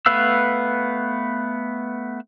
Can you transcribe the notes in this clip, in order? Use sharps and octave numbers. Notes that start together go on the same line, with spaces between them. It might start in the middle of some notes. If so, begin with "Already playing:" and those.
A3 B3 B4 F5 E6